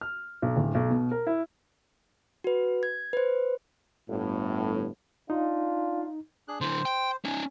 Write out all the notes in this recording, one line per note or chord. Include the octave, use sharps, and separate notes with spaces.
F6
B1
D1
B1
B2
A#4
E4
F#4 B4
G#6
B4 C5
G1 A2
D4 D#4 F4
D4 G#4 F#6
D3 E4 C5
G5
C#4 D#4 G#5